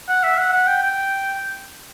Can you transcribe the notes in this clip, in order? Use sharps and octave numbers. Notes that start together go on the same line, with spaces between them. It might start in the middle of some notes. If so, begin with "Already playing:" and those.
F#5
E5
F#5
F#5
G5
G5